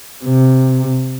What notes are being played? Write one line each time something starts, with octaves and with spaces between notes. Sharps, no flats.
C3